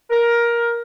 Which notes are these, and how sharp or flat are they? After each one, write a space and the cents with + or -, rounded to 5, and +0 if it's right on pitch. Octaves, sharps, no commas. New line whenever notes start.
A#4 +15